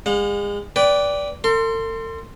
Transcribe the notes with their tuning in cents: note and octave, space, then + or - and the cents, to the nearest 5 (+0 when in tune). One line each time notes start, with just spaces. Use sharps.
G#3 -35 F#5 -45
B4 +0 D5 -15 G5 +0
A4 +45 C6 +0